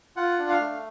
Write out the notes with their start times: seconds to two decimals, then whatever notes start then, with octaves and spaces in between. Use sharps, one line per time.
0.17 F4 F#5
0.39 D4
0.49 F5
0.60 A3